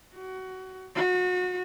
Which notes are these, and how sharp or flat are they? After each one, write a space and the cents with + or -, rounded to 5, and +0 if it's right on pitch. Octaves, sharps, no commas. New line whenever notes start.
F#4 +25
F#4 -30